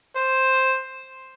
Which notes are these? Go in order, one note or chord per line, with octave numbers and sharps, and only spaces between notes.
C5